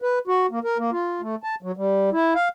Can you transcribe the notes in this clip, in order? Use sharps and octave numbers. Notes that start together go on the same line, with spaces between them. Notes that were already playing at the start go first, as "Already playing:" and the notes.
B4
F#4
A#3
A#4
A#3
F4
A3
A5
F#3
G3
E4
F5